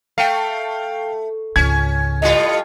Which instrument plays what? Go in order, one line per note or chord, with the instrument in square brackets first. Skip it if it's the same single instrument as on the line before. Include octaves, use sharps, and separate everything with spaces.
[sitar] A3 [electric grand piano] F5 G5
[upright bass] C#2 G#2 [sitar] C#4 [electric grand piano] G#6
[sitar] A2 G3 F4 [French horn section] D#5